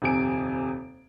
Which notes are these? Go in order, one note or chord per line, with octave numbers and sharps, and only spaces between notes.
D#1 F2 C3 G#5 D7